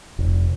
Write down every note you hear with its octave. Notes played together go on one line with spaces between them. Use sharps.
F1